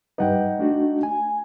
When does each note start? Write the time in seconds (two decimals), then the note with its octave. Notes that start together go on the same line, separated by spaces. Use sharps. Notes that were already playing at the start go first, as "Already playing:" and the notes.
0.18 G2 G3 D#4 B4 F#5 G5
0.59 A3 D4 F#4
1.03 G#5